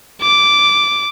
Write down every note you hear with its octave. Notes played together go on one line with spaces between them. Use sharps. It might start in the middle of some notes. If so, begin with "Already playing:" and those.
D6